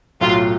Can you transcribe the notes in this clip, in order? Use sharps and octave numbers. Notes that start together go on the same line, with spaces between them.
B1 A2 F#3 F4